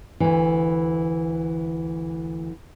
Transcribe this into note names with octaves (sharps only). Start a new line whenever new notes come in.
D2 E3